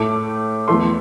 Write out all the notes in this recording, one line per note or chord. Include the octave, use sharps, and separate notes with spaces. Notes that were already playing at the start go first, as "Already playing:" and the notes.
Already playing: A2 A3 D6
E2 E3 A3 C6